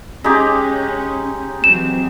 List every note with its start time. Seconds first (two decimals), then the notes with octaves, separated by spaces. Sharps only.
0.24 G#3 C#4 D#4 G4
1.64 E3 F#3 C4 E7